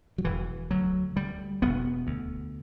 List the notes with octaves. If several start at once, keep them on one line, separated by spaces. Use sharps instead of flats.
F#3
E1 E3
D2 F#3
D2 G3
E1 B3
D2